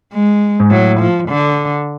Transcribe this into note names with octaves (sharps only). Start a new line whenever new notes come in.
G#3
G#2
A2 F#3
F3
D3